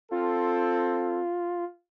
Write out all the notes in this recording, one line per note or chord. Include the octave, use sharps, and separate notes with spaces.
C4 F4 A4